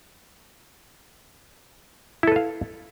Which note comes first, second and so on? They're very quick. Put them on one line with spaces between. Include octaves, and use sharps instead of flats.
E4 A4 B4 F5